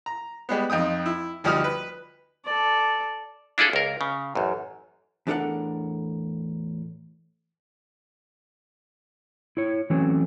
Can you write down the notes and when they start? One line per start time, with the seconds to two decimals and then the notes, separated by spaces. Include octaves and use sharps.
0.06 A#5
0.49 G3 G#3 B3
0.70 F2 D#4 G5 D#6
1.06 E4
1.44 D2 F3 G3 D#4 D#6 F6
1.64 B4
2.45 A4 D5
3.58 D4 E4 F4 G#4 A4
3.73 C#2 A#4
4.01 C#3
4.35 A1 F#2
5.27 E2 A2 D4 A4 A#4 F#5
9.57 E4 C#5
9.90 E3 F#3 A3 C4 C#4